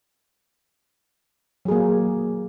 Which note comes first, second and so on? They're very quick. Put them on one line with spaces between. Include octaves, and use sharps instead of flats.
F#3 G#4 A#3